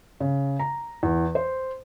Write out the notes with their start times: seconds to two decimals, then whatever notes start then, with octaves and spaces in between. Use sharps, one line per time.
0.20 C#3
0.59 A#5
1.03 E2
1.35 C5